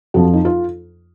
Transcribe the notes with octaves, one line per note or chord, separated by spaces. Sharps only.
F2 F3 F#4
D#4
F4